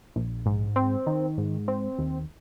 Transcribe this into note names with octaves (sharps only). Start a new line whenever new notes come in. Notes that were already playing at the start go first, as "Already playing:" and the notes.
A#1
G#2
C4
D#3
G#2
C4
D#2